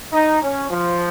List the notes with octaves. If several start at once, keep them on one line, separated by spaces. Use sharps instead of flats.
D#4
C#4
F3